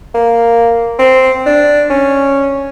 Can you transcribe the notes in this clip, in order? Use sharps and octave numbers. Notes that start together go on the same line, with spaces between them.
A#3
C4
D4
C#4